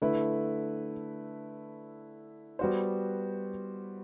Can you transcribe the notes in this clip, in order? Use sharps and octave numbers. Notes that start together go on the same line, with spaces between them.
D3 A3 E4 B4
G3 B3 F#4 C5